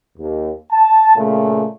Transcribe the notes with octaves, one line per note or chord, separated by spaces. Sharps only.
D#2
A5
A#2 C#3 A3